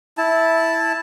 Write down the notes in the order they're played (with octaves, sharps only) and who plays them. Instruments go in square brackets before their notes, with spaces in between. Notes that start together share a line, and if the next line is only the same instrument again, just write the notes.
[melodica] E4 A5